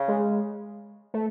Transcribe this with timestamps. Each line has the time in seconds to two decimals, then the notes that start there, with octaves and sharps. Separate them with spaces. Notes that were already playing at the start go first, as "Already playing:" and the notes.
Already playing: C#3
0.08 G#3
1.14 A3